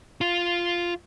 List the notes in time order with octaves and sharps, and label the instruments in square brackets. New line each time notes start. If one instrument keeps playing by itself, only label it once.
[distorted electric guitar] F4